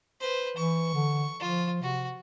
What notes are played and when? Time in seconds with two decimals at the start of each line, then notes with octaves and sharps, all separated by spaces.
0.20 B4 C5
0.57 E3 C#6
0.94 D3
1.40 F3 F4
1.82 C3 F#4